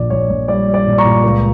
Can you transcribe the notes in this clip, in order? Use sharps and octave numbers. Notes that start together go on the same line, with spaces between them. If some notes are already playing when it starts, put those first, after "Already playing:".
Already playing: A#1 A#2 D5
A#1 C#5
A#1
G3 D5
G3
D5
A#2
A#5 C#6
A#2
C#2